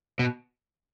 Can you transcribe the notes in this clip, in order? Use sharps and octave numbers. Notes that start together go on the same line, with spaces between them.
B2